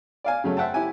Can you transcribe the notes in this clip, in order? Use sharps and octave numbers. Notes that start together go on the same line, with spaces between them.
D5 F5 G#5
C#3 F#3 A3
C5 E5 F#5 G5 A5
E4 G4 G#5